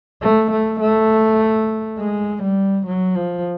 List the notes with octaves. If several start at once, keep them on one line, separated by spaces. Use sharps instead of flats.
A3
A3
A3
G#3
G3
F#3
F3